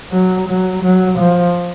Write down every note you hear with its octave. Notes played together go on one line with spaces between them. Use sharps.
F#3
F#3
F#3
F3